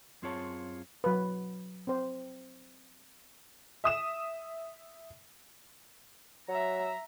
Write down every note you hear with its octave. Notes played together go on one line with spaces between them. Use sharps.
F#2 C4 F4 G#4 C#5 A5
F#3 B4
C4 C5
E5 D#6 E7
F#3 E5 A#5